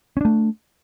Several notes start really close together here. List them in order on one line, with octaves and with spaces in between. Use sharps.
C#4 D4 A3